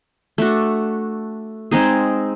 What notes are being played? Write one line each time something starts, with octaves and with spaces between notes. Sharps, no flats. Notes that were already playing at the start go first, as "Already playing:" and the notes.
A3 D4 F#4
G#3 C4 D#4 G#4